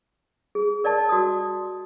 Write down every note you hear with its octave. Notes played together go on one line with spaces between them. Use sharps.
G#4
A#4 D5 D#5 A5
F#4 D5 D#6